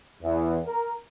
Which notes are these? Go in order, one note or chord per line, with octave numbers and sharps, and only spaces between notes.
E2
A#4